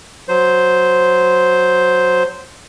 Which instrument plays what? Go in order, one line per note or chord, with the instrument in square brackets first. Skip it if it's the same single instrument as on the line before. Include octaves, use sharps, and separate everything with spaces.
[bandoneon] F#3 C5